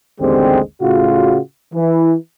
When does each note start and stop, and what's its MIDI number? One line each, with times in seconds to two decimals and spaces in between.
0.21 0.60 33
0.21 0.60 39
0.21 0.60 50
0.21 0.60 56
0.21 0.60 60
0.21 0.60 67
0.82 1.39 45
0.82 1.39 49
0.82 1.39 65
0.82 1.39 66
1.74 2.15 52